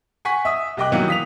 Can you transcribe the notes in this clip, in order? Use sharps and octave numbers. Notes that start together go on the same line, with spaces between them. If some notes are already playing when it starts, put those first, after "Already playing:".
F#5 G#5 C#6 B6
E5 D#6
C2 G4 D#5 G5 D6 F#6
D#3 E3 F#3 G3 A#3 B3
D#6 B6 F7